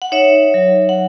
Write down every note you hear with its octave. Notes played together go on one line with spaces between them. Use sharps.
F#5
D#4 C#5 E5
F#3
F#5